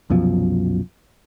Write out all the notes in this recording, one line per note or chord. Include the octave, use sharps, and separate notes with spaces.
C2 F#2 B2 F3